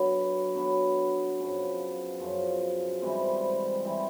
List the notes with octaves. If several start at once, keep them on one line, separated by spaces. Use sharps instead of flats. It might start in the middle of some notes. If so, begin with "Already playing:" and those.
Already playing: D3 F#3 B3
D3 F#3 B3
F#2 C#3 F3
F#2 C#3 F3
G#2 E3 G3 C4
E3 G3 C4